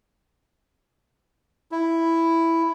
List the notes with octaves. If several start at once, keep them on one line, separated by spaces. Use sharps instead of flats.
E4